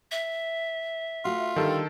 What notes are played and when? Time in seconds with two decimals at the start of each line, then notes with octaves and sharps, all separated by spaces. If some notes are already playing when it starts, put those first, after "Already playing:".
0.11 E5
1.25 A3 F4 F#4
1.56 D3 D#3 G3 A4